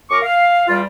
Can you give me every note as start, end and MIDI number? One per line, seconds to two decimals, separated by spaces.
0.11 0.19 42
0.11 0.19 70
0.11 0.19 85
0.11 0.19 86
0.23 0.65 77
0.68 0.82 40
0.68 0.82 55
0.68 0.82 65